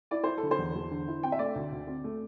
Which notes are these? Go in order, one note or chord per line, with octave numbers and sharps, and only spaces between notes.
E4 D5
E4 C5
A4
D3
C5
E2
E2
D3
E4
C4 G5
E5
A3 D5
D2
D2
C4
A3